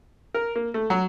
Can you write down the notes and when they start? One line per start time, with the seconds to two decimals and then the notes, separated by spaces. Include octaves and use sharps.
0.35 A#4
0.56 A#3
0.74 A3
0.90 F#3